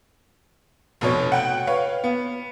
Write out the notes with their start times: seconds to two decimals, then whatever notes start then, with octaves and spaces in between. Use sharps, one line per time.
1.01 F1 B2 C#5
1.32 F#5 G5
1.67 B4 C#5 F5
2.04 B3